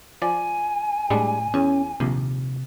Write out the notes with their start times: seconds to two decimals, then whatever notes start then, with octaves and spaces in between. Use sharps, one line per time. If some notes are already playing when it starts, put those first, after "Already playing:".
0.22 F3 D5 G#5
1.10 A2 G3 G#3 D4
1.54 E2 C#4
2.00 A#1 D#2 C3